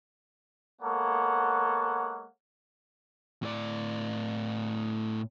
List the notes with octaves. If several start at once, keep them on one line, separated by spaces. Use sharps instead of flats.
G#3 A#3 B3 A4 C#5 F#5
A2 D5